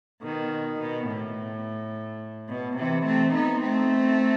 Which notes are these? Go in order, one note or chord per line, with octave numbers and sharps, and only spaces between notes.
B2 D#3
B2
A2
B2
C3 E3
A3 C4
B3 D#4
A3 C4